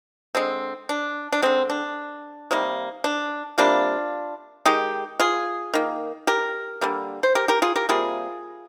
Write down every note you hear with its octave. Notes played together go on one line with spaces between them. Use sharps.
D3 G#3 C4
D4
D4
D3 G#3 C4
D4
C3 D#3 G3 A#3
D4
C3 G3 A#3 D4 F4
D#3 G#3 D#4 G4
F4 G#4
D#3 A#3
G4 A#4
D3 G3 A#3
C5
G4 A#4
G4 A#4
F4 G#4
G4 A#4
C3 G3 A#3 F4 G#4